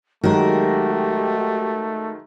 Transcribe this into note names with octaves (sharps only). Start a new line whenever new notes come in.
D#3 F#3 G#3 A3 F#4 G4 A#4